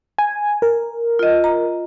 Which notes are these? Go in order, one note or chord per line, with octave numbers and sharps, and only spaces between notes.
G#5
A#4
F4 D#5
A#5